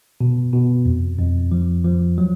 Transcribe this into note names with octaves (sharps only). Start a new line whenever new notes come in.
B2
B2
F2
F2
F3
F3
F#3